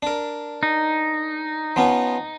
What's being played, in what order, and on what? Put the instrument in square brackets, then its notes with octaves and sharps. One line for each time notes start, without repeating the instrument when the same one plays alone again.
[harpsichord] D4 A#4
[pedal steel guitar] D#4
[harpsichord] F3 B3 C#4